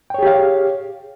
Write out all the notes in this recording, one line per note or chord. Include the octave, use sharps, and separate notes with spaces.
G4 G#4 C#5 F5 G5